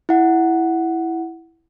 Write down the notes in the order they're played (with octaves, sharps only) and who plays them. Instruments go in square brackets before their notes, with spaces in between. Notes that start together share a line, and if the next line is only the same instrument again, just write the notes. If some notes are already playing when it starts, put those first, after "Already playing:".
[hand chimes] E4 F#5